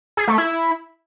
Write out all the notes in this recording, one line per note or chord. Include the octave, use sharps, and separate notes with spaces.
G#4
A3
E4